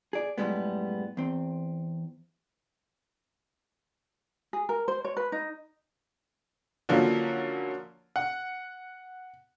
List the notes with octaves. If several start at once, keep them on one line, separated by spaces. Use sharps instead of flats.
G#4 D5
F#2 A2 D3 G3 G#3 B3
E2 C4
G#4
A#4
C5
C#5
B4
D#4
D3 F3 F#3 A#3 C#4
F#5